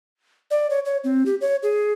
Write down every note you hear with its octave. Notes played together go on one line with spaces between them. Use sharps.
D5
C#5
C#5
C4
G4
C#5
G#4